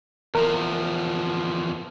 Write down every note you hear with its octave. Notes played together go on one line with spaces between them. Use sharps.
E2 F3 A#4